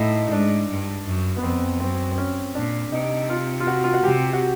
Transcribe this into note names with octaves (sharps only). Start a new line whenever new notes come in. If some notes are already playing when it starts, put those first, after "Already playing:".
Already playing: A2 D#4 E4
D#4
G#2 D4
G2
F#2
B3
F2 C4
F#2 C4
C4
C#4
A#2 D4
C3 D#4
F4
F4
F#4
F4
F#4
C3 G4
F#4